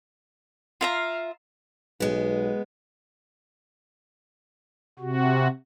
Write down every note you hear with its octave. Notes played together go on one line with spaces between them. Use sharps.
F4 E5 F5 A#5
B1 G#3 B3
C3 F#4